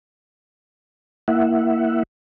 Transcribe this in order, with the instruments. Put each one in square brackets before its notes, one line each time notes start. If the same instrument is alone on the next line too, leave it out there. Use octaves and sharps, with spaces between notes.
[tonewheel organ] A#3 E4 E5 F#5